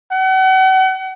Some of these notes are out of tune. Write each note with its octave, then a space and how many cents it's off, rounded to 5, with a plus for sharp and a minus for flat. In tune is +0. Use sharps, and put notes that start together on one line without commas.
F#5 +40